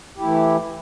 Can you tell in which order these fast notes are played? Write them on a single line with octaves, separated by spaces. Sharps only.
G4 E4 A3 E3